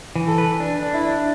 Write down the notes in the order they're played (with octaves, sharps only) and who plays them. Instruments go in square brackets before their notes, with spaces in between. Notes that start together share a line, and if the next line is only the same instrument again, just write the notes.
[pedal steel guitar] E3
[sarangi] A4
[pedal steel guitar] B4
D4
D4
[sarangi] E4
[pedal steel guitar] D4